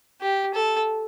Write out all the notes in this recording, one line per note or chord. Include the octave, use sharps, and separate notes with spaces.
G4
A4